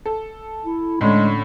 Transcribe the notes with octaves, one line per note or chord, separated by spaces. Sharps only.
A4
E4
A2 D3 G#3 C#4